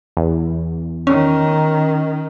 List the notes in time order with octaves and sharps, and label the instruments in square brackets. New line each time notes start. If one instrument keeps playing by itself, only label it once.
[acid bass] E2
[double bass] D#3 [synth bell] C#4